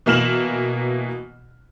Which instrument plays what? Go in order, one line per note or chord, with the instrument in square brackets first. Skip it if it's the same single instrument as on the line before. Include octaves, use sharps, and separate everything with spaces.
[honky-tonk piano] B2 E3 A#3 F6 E7 F#7